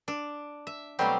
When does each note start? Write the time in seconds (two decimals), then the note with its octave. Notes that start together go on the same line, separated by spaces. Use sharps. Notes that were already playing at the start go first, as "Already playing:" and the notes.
0.08 D4
0.67 E5
0.99 B2 F#3 G3 A3 C4 G4